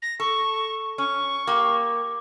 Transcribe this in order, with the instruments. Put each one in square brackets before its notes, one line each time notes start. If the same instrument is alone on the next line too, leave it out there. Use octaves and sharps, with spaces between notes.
[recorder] A#6
[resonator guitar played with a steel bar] A4 [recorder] C#6
[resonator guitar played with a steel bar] C#4 [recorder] C#6
[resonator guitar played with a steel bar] A#3 G4 [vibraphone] D6